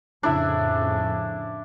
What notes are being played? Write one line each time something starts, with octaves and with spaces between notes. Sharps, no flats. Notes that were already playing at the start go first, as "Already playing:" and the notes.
F2 A2 C#3 D4 E4 E5